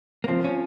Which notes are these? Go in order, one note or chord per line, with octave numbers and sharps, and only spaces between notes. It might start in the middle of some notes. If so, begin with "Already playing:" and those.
A#3
F3 C4
C#4